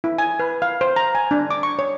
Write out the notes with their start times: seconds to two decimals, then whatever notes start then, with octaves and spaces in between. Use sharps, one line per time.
0.04 E4
0.18 G#5
0.40 B4
0.62 F5
0.81 C5
0.96 A#5
1.15 G#5
1.31 D4
1.51 D6
1.63 C#6
1.79 C#5